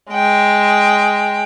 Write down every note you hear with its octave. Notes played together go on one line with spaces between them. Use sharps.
G#3 G5